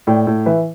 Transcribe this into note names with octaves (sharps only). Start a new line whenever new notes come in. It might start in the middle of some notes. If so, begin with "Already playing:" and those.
A2 D5 G5
A2
E3 B4 E5